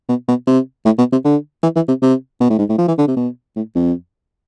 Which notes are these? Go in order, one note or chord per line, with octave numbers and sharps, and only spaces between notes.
B2
B2
C3
A2
B2
C3
D3
E3
E3
C3
C3
B2
A2
G#2
A2
F3
E3
D3
C3
B2
A2
F2